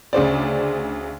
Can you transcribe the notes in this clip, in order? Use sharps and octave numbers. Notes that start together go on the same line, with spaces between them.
D2 C#3 C5 D5